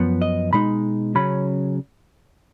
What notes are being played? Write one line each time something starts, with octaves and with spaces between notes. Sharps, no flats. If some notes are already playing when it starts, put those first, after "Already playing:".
Already playing: F#2 F3 B3
D#5
B2 G#3 D#4 B5
C#3 F#3 C#4 B5